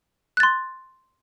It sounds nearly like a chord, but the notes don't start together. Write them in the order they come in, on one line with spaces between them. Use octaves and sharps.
F#6 A6 C6